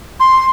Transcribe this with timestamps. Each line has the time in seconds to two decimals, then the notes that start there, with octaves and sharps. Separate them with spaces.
0.20 C6